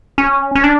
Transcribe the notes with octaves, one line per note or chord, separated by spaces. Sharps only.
C#4
C#4
D4